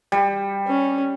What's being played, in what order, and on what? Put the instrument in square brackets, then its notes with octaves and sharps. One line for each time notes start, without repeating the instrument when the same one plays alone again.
[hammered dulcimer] G3
[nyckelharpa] C#4